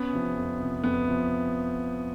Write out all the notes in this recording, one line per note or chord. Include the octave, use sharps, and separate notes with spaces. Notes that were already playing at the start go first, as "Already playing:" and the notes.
Already playing: B3 C#4
C3 F3
F2
C3 F3
F2 B3
C3 F3